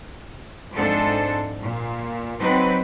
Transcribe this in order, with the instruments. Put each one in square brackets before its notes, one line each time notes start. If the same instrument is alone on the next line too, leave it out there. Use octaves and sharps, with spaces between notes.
[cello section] F2 G#2 D4 A4 C5
A#2
F#3 C4 D#4 B4